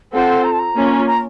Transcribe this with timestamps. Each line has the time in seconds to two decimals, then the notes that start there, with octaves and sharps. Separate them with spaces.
0.13 C4 F4 A4 C5 F#5
0.44 A#5
0.52 A5
0.59 A#5
0.75 A#3 C#4 F4
1.07 A#5